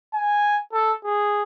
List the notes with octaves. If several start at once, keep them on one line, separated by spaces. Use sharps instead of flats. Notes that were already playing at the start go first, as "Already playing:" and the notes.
G#5
A4
G#4